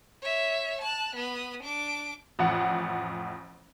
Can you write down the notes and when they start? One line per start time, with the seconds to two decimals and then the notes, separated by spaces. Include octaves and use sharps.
0.22 C#5 E5
0.82 A5 F#6
1.15 B3 D#6
1.63 D4 D6
2.39 A1 F2 F#5